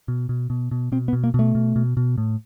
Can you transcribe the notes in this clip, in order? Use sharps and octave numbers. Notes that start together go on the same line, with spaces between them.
B2
B2
B2
B2
B2 C4
B3
B2
A#3
B2 A3
B2
B2
B2
A2